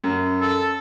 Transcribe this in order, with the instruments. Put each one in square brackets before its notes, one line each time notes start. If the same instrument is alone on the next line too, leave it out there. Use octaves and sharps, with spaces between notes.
[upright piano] F#2
[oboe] A4